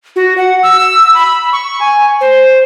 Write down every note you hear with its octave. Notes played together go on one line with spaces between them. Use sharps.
F#4
F#5
E6
E6
B5
C#6
G#5
C5